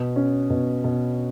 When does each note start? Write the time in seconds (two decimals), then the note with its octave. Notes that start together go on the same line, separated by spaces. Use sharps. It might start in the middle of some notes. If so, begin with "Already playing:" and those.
Already playing: B2
0.16 C#4
0.50 B2
0.84 B2